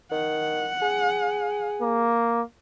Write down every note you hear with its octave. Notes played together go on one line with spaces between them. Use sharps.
D#3 F#5
G#4
A#3